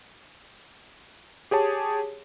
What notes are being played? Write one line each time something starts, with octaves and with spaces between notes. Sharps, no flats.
G4 G#4 C#5 A5